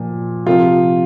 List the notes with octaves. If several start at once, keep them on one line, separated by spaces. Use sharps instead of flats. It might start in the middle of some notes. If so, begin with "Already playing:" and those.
Already playing: A#2 F3
C3 F3 F4